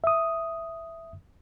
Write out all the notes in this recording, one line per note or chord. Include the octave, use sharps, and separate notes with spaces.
E5 D#6